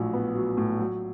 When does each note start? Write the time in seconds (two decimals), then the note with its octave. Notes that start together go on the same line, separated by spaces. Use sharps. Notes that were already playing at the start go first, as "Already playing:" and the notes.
Already playing: A#1 A2 F#3
0.13 B3
0.35 F#3
0.57 A2
0.79 F#3